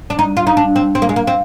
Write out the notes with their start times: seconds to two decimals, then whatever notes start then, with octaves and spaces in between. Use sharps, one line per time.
0.10 D4
0.19 D#4
0.37 F4
0.47 D#4
0.57 D4
0.76 C4
0.95 C4
1.02 A#3
1.09 G#3
1.16 A#3
1.27 C4